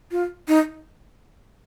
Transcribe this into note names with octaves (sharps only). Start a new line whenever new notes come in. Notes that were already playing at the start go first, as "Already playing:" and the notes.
F4
D#4